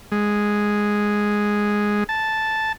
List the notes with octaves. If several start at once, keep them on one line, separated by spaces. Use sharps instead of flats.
G#3
A5